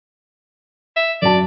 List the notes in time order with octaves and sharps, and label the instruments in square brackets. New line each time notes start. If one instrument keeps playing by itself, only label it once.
[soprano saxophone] E5
[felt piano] F#2 F#4 A5 [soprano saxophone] D5